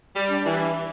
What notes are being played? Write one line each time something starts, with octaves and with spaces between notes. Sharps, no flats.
G3
D4
E3